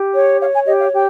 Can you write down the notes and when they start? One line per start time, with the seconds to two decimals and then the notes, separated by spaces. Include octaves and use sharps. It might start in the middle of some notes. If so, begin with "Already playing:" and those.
Already playing: G4
0.12 C#5
0.39 C#5 F5
0.52 G#5
0.66 G4 D#5
0.79 F5
0.93 G4 G5